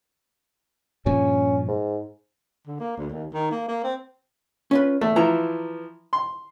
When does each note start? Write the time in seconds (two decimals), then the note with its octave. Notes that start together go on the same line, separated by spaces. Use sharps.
1.06 G2 A#2 F3 C#4
1.68 G#2
2.67 D3
2.80 A#3
2.97 D2
3.10 D#2
3.34 D#3
3.52 A#3
3.68 A#3
3.84 C4
4.71 C#4 F4 B4
5.01 E2 A3
5.16 E3 F3 E4 A#5
6.13 C6